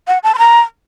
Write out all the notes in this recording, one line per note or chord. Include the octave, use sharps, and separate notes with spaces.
F#5
A5
C6
A#5